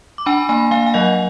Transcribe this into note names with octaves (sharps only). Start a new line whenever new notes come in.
D6
D4 G#5 B5
A#3 G#5 B5
A#3 F5 G#5
G#5
F#3 D#5 F#5